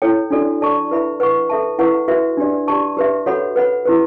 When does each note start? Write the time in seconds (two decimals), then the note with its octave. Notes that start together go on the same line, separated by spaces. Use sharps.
0.02 E4 A4 C#5 G5
0.30 D4 F#4 A4 D5
0.61 A4 D5 A5 C#6
0.90 E4 B4 E5 B5
1.20 B4 F#5 C#6
1.50 A4 E5 A5
1.79 E4 B4 F#5 C#6
2.08 F#4 B4 E5
2.37 D4 G4 D5
2.68 G4 D5 A5 C#6
2.97 G4 B4 E5
3.26 F#4 A4 C#5 F#5 B5
3.56 B4 F#5 B5
3.85 E4 G4 B4